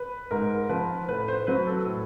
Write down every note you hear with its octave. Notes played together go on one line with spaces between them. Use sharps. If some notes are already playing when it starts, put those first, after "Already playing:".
Already playing: B4
G#2 A#4
F3 B4
A2 B4
C5
F#3 B4
A4
A2